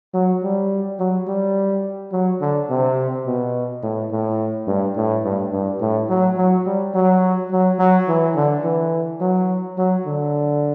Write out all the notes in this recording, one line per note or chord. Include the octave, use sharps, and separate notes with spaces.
F#3
G3
F#3
G3
F#3
D3
C3
B2
A2
A2
G2
A2
G2
G2
A2
F#3
F#3
G3
F#3
F#3
F#3
E3
D3
E3
F#3
F#3
D3